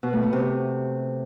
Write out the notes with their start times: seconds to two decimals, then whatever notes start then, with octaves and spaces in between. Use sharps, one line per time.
0.03 B2
0.13 A3
0.23 B3
0.33 C3